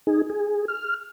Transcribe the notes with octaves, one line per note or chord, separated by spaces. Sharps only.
D#4 G#4
G#4
F6